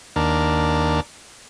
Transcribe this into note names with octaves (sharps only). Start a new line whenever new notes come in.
D#2 D4 A#4